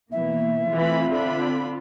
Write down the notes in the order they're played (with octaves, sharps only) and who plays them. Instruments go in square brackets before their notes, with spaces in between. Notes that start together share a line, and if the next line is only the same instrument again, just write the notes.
[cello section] B2 E3 A#3 [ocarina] E5
[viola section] E3 A3 B5 [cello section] C4 F4
[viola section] D3 D4 B5